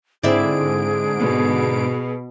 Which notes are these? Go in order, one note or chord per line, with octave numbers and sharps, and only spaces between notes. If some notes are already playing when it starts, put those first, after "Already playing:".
G#2 D3 C4 E4 G#4 D5 D7
B2